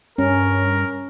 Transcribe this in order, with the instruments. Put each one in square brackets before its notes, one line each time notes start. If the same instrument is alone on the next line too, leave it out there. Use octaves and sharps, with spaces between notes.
[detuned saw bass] G2 [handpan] C#4 [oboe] A#4